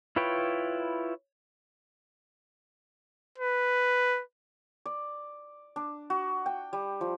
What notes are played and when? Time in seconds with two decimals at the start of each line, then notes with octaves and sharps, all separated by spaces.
0.16 E4 F4 B4 C#5 G5
3.38 B4
4.86 D5
5.76 D4
6.10 F#4
6.46 G5
6.73 G3
7.01 F3